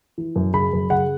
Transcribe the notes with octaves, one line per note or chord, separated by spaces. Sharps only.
E3
F#2
C#3 B5
F#2
C#3 F#5